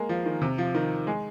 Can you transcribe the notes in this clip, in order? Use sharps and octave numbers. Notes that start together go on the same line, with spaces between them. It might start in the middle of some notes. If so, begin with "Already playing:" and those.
Already playing: G#3 A#3
F3
D#3
C3
F3
D#3
G#3